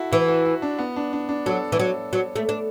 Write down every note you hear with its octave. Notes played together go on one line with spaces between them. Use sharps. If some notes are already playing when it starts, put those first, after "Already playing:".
Already playing: E4 F#4 A4
E3 E4
F#4
F#4
D4
B3
D4
D4
D4
F#3 A4
E3
F#3
F#3
A3
D4